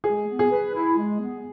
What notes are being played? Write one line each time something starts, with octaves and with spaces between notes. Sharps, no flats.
G#3 G#4
B3
G#4
B4
E4
G#3
B3